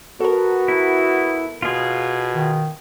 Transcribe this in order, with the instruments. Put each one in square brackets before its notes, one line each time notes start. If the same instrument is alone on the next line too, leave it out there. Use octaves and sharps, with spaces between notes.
[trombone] B3 [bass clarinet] F#4 [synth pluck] A4 A#4
[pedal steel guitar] E4
[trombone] B2 [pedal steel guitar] F4 G#4
[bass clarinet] D#3